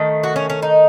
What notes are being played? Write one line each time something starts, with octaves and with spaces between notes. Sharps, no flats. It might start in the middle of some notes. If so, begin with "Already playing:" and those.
Already playing: D#3 A3
F#4
C#4
C#4
D#4